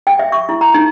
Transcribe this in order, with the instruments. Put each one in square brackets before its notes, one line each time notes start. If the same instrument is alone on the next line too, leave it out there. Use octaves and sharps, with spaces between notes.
[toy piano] G5
E5
C#6
E4
A#5
D#4